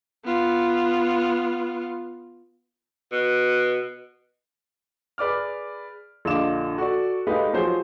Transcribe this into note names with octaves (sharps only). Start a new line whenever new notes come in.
B3 F4
B2
G#4 B4 D5 D6 F6
A#1 D3 F4 D#5 D6 E7
F#4 A4 D5
G#3 A3 D#4 G4 B4 F5
F3 F#3 G4 G#4 C5 C#5